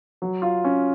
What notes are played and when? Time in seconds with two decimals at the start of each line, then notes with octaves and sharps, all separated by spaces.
0.22 F#3
0.42 F4
0.64 C#4